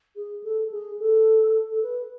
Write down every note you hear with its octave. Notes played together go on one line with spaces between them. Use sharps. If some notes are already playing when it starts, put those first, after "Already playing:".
G#4
A4
G#4
A4
A4
B4